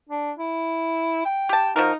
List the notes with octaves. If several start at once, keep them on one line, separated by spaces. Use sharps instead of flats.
D4
E4
G5
G4 A5
F3 D#4 F#4 A#4